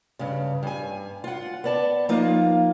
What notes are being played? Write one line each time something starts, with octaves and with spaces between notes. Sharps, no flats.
G2 C#3
G2 G#5
F4 F#5
B3 D5 A5
F3 A#3 D#4 F4